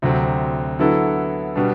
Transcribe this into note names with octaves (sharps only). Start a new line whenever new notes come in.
D2 C3 F#3 C4
D3 F#3 B3 E4 A4
B2 G3 B3 D4